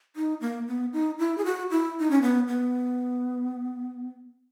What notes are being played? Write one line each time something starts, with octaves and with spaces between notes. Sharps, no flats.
D#4
A#3
B3
D#4
E4
G#4
F#4
E4
D#4
C#4
B3
B3